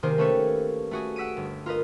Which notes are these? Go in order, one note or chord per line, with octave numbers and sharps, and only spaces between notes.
C3 D#3 A#3 G4 G#4 C5
A3 A#3 C#4 A4 B4 C#5
A3 F#4 G#4
F#5 E6 B6 D7 D#7
G1
F4 A#4 B4 D#5